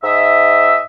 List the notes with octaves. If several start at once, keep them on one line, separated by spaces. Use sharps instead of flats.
G#2 D#5 E5